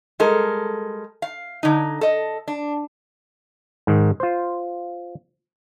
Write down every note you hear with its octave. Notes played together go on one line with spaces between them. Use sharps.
G3 G#3 A4 A#4
F5
D3 D#4
A4 D#5
D4
G#2 D#3
F4 C5